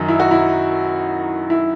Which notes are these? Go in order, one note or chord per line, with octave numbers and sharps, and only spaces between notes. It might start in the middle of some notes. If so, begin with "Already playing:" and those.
Already playing: F#2 D#3 F#3 D#4
E4
F#4
E4
E4